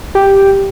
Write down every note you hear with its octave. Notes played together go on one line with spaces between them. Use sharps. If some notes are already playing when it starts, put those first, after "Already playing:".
G4